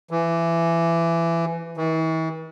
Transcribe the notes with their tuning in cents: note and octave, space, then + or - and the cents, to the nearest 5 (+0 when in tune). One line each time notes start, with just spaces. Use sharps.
E3 +20
E3 -45